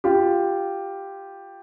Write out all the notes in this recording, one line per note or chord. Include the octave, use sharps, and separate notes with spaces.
F4 G4